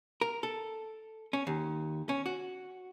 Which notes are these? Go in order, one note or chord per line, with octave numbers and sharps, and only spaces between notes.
A#4
A4
C#4
D#2
C#4
F#4